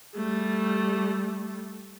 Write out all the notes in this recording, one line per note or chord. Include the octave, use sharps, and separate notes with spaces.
G3 A3